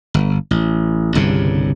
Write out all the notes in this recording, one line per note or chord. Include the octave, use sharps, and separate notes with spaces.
G1
A1
G1 C2 G2 C#3